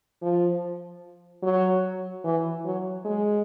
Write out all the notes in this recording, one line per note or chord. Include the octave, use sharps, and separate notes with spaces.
F3
F#3
E3
F#3
G#3